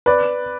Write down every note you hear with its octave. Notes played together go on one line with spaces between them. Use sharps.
B4 D5